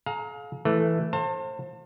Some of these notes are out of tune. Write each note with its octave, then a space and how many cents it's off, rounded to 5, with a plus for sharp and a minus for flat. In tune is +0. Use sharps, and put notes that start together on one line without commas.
G#4 +45 F5 +25 A#5 +0
E3 +0 A3 +0
C5 +30 F5 +30 A5 +40